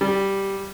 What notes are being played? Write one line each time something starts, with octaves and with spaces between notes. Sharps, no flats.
G3